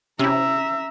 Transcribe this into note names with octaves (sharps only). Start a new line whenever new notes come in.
C3 C#4 E4 E5 A#5